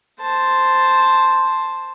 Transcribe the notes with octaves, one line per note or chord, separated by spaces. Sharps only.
C5 A5